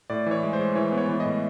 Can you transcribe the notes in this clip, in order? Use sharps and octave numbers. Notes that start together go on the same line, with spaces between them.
A2 D5
E3 C#5
G#3
C5
G#3
E3 C#5
B3
C#5
E3
D#5
A2